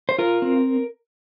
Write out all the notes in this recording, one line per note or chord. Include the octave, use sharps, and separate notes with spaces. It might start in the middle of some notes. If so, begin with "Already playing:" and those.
C5
F4 A#4
C4